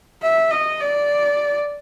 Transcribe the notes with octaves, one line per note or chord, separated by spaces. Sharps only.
E5
D#5
D5